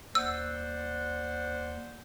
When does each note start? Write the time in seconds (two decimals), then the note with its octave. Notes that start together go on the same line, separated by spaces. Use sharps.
0.15 D#2 C5 D5 F#5 E6